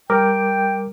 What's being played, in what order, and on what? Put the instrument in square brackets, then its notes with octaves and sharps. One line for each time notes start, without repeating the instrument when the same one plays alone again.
[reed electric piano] G3 A#4 D6 [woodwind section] G5